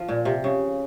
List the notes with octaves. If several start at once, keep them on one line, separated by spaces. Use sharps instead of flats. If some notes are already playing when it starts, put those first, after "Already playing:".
Already playing: F3
A#2
C3
C#3